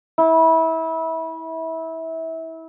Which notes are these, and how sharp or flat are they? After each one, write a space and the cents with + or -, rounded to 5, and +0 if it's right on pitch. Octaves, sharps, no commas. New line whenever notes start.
E4 -25